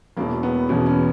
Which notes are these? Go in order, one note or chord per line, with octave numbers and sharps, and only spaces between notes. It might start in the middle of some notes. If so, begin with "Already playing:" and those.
E1 E2 B2 A#3
B3
E1 E2 B2 C#4
C#4